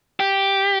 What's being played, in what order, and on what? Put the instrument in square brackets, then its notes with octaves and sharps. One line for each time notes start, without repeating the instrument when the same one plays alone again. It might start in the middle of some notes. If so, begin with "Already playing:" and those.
[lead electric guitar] G4